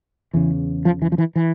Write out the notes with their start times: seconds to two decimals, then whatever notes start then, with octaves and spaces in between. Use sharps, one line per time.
0.33 E2 C#3 E3
0.85 F3
1.02 E3
1.12 F3
1.18 E3
1.36 E3